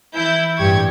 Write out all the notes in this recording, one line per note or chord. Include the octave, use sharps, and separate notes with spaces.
E3 E4 G6
A1 G2 G4 G5 C#6 G#6